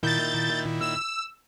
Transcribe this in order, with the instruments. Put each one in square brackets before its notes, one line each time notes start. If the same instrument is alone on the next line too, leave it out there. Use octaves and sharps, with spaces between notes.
[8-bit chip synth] A#2 D#3 E4 [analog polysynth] G6 A6
[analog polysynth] E6